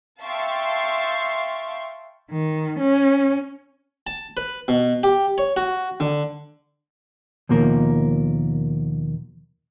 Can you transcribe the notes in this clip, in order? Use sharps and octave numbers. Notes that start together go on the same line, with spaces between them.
E5 F5 G5 A5 C6 C#6
D#3
C#4
A5
B4
B2
G4
C#5
F#4
D3
D#2 B2 F3 A#3 A#4